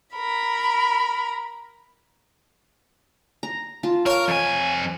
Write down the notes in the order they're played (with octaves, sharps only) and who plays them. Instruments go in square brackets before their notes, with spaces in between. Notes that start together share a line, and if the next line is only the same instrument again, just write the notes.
[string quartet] A#4 B5
[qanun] A#5
F4 A5
[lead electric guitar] A#4 [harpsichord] C#5 F5
[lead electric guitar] F2 G#5